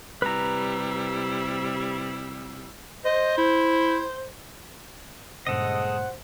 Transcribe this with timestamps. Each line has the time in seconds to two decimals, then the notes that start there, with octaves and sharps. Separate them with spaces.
0.22 C3 G3 E4 B4 A#5
3.05 C5 D#5
3.38 E4
5.47 G2 A#2 C#3 G#3 A4 C5 D#5 F#5